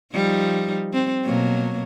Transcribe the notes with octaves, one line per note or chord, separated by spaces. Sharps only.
F3 G3 D#4
C4
B2 F#3 A#3